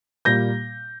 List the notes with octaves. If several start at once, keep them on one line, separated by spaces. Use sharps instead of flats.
A#2 G3 A#3 G6 A#6